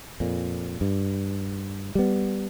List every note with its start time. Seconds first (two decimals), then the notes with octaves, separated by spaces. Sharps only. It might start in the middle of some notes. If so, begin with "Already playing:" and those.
0.20 F2 A#2
0.81 G2
1.95 G3 B3